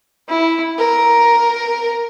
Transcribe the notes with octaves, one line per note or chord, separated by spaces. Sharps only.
E4
A#4